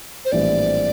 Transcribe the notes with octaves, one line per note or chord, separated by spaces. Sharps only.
C5
A#1 A2 E3 G3 C4 D5